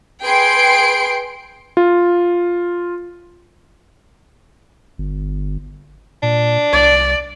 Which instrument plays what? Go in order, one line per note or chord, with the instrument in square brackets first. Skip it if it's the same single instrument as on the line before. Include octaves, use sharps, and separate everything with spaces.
[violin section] G#4 B4 G5 C6 C7 D7
[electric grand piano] F4
[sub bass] G1
[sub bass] A#2 [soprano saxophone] D4
[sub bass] C2 [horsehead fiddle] D5